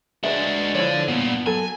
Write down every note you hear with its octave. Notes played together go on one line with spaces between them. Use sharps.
G#3 D4 F#4 B4 E5
D3 F3 D4 E4 C#5
G2 A#2 B3
F#3 A4 G#5